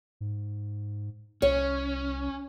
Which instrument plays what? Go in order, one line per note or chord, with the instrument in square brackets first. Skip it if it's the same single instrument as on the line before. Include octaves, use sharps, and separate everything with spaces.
[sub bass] G#2
[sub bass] C2 [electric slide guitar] C#4 [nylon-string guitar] C#5